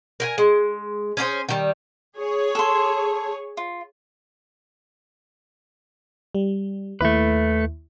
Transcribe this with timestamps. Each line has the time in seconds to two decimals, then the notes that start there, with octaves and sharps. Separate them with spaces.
0.20 A#4 G5 G#5
0.38 G#3
1.17 C#4 D4 G#4 C5
1.49 D#3 G3
2.18 G#4 C#5
2.55 A4 C6
3.57 F4
6.35 G3
7.01 D#2 A3 E4 B4